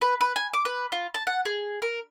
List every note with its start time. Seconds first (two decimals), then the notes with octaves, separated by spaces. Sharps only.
0.01 B4
0.21 B4
0.36 G#5
0.53 D6
0.65 B4
0.92 F4
1.14 A5
1.27 F#5
1.45 G#4
1.82 A#4